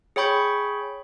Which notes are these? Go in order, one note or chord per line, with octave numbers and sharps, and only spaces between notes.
G#4 C#5 G5 B5 C#6 G6